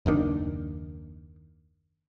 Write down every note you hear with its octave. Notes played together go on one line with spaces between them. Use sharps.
F#1 D#2 D#3 D4